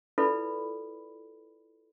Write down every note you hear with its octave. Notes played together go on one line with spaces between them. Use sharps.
E4 F4 A4 B4 D5 B5